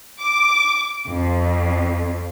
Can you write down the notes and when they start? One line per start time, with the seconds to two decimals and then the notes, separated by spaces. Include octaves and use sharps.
0.19 D6
1.07 F2